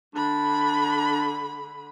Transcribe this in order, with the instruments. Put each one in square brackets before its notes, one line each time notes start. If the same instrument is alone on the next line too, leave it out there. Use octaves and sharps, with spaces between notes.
[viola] D3 B5 [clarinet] D4